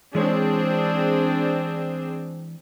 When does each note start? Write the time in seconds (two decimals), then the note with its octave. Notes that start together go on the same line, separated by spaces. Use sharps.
0.15 E3 G#3 C4 D4 G#4 C#5